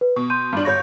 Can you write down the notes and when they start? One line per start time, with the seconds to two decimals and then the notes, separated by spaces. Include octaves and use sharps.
0.01 B4
0.16 B2 C#6
0.30 C6 G6 D#7
0.53 G2 D4
0.65 G1 C#5 C#6 G6 A#6